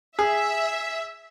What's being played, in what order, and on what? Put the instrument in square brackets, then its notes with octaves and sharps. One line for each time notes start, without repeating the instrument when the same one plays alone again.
[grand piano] G#4 [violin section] E5